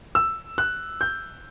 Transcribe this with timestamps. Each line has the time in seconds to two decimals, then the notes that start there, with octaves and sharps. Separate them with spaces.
0.15 E6
0.58 F#6
1.01 G6